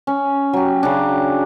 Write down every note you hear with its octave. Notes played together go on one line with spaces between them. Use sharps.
C#4
F#3 G4
C#3 D4